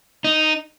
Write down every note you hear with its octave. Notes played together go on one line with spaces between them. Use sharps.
D#4